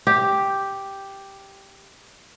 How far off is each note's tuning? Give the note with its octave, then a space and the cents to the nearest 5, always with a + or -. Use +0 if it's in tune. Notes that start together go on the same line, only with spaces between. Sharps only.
G4 +0